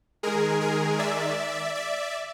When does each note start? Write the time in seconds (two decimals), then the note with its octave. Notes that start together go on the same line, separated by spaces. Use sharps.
0.23 D#3 G#3 G#4 A#4
0.61 G#4 A#4
0.99 D5 E5
1.75 D5 E5